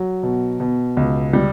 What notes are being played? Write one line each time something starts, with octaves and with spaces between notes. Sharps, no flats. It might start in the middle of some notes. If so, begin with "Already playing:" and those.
Already playing: F#3
B2
B2
C#2
G3